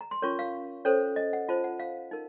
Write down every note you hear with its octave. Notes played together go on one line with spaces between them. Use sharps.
A#5
C6
C#4 F4 A#4 C#5 C#6
F5
C#4 A4 C5 C#5
D#5
F#5
F4 C5 A5
F#5
F5
D#4 A#4